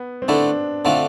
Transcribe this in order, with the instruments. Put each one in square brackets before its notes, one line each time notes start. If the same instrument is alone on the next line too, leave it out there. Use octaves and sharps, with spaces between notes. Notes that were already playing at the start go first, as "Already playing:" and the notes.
Already playing: [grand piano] B3
C4
[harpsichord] D3 A3 E4 [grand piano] D4
[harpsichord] D3 A3 C4 F4 [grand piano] D4